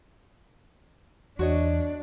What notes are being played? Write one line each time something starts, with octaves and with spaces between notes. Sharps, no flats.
E2 D4 F#4 C#5 D#5